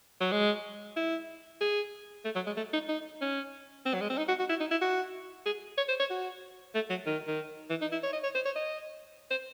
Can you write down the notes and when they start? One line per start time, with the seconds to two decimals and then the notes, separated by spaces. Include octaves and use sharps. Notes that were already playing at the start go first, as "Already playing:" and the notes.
0.20 F#3
0.32 G#3
0.96 E4
1.61 G#4
2.25 A3
2.35 F#3
2.46 G#3
2.56 A3
2.73 D#4
2.89 D#4
3.21 C#4
3.85 C4
3.94 F#3
4.01 G#3
4.09 C4
4.18 D#4
4.28 F#4
4.39 F#4
4.49 E4
4.60 D#4
4.71 E4
4.81 F#4
5.46 G#4
5.77 C#5
5.88 C5
6.00 C#5
6.10 F#4
6.75 A3
6.90 F#3
7.06 D#3
7.27 D#3
7.70 E3
7.81 D#4
7.92 E4
8.03 C#5
8.13 D#5
8.23 C#5
8.35 C5
8.45 C#5
8.56 D#5
9.30 C5